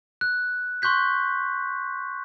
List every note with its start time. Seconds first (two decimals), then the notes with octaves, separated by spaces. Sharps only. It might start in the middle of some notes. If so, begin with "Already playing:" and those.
0.21 F#6
0.82 C6 C#6 F#6 G6 B6